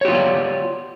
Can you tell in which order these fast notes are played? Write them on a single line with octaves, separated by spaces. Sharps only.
C#5 G4 F4 B3 D5